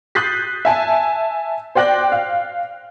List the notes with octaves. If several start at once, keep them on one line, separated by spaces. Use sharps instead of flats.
D#6 F#6 G6 A6 B6 C7
E5 G#5 A5
C5 D5 G5 F#6 A#6
F5